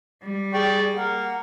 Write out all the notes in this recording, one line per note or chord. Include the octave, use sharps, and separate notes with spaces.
G3
G#4 D5 G5 C#6
A#3 F#5